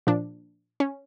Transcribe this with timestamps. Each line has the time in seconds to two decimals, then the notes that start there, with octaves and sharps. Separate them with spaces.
0.07 A#2 F3 D4
0.80 C#4